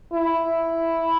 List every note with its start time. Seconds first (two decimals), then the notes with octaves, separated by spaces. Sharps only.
0.14 E4